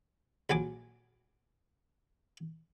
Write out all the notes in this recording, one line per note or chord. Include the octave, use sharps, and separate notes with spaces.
A#1 F#3 G#5 D6